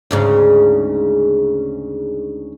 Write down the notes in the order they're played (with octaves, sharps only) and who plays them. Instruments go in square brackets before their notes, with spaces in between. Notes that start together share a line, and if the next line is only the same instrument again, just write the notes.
[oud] D2 G#2 C#3